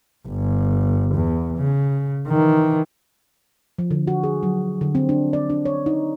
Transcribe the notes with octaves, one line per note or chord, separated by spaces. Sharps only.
G1
E2
C#3
D#3 E3
F3
D3
F#4
G#4
F#3
D3
C4
D4
D5
D4
C#5
D#4